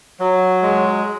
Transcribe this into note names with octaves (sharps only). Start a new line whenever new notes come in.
F#3
G#3